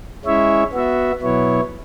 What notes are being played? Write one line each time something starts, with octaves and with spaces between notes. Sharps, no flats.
G#3 C#4 E4 C#5 E5
B3 F#4 E5
B2 F#3 B3 E4 C#5